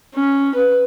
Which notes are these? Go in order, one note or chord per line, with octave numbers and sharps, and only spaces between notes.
C#4
B4